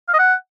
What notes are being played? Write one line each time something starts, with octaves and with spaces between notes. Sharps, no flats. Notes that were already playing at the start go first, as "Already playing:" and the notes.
F5
D#5
F#5